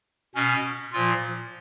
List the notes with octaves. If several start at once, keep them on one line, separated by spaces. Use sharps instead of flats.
B2 C#4
A#2 F3 F4